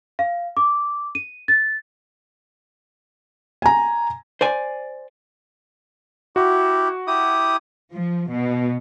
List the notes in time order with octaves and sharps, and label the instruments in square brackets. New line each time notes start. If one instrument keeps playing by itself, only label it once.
[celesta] F5
D6
D#7
A6
[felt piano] G#5 A#5
[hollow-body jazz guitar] C5 D5 G#5
[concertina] E4 G4 [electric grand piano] F#4
[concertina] E4 G4 D#6
[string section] F3
B2